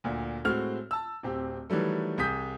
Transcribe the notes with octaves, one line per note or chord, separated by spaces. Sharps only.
D2 A#2
A2 G#3 C4 F#4 F6
A5 E6
D1 C4 G4
D#3 E3 F#3 G3 A3
C2 G#4 D#6 G6 B6